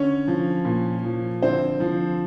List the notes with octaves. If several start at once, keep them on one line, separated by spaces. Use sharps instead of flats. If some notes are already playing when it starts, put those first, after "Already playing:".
Already playing: D3 C#4 C#5
F3
A#2
F3
D3 C4 C5
F3